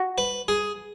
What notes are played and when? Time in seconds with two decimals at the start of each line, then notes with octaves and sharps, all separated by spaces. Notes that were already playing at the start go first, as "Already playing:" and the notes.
Already playing: F#4
0.18 B4
0.48 G#4